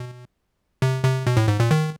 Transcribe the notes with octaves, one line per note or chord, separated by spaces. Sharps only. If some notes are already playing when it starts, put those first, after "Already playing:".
Already playing: B2
C3
C3
B2
A2
G#2
A#2
D#3